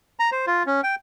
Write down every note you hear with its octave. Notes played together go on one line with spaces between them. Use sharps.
A#5
C5
F4
C#4
G5